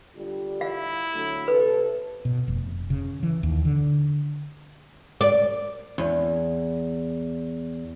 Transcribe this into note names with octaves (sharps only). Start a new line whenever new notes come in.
D3 G3 F4
E4 F5
D3 F#3 A3
A2 C3 A4 B4
B2
F1
C#3
E3
D#2
D3
D5
E2